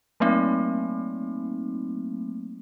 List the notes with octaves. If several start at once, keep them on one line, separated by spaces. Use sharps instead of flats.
F#3 A3 A#3 C4 D#4